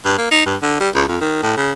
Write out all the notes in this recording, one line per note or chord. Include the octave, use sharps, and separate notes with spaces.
G2
A#3
D#4
G2
D3
G3
C#2
F2
D#3
A2
C#3